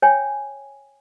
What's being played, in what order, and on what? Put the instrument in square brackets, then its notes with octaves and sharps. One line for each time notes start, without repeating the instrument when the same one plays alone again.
[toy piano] C#5 G5 G#5